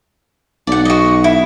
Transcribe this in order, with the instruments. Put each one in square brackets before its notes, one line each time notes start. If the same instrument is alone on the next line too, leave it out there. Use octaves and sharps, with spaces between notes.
[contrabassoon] B1 [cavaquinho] D5 F#5
[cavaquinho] F#4 D#5
E4